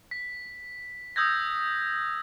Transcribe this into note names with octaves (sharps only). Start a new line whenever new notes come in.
B6
D#6 E6 G6 G#6 A#6